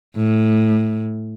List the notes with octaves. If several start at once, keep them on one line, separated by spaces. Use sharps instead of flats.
A2